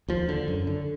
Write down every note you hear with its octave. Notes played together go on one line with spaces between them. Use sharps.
D#2 F3
D3
F#2
D3